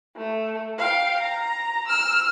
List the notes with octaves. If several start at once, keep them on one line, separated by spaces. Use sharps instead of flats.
A3
F5 G5
A#5
E6 F6